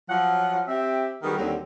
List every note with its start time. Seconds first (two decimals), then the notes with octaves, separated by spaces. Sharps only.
0.09 F3 F#3 F#5
0.68 C4 G4 E5
1.23 D#3 G3 B3 F#4 G#4 A#4
1.37 D#2 D3 F#3 G3 C4 G4